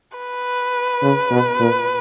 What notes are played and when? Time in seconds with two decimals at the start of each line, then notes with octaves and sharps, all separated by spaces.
0.17 B4
1.03 C#3
1.31 B2
1.60 A#2